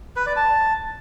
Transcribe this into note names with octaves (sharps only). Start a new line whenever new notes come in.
B4
D5
A5